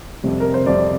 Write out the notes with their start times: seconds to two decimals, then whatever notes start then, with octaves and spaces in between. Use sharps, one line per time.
0.23 F2 C3 G3
0.40 A#4
0.54 C5
0.66 F2 C3 G3 D5